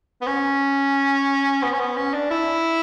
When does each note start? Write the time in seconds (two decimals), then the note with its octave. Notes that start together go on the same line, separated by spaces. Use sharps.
0.22 B3
0.27 C#4
1.63 B3
1.74 C#4
1.80 B3
1.97 C#4
2.14 D4
2.31 E4